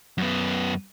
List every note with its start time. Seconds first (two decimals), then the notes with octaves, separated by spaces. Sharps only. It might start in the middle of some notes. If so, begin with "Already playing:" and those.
0.18 F#2 B3